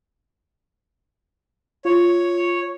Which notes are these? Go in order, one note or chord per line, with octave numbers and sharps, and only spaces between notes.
F4 C#5